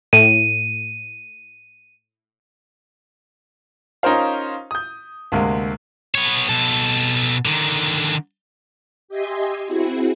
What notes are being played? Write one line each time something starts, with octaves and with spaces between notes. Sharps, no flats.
A2 D#7
C#4 D#4 F4 A#4 C5 F5
D#6 G6
D2 C3 G#3 A#3
B3 C#5
B2 A4
D3 D#3
G4 D#5 E5 G#5 C6
C4 E4 F#4 G#4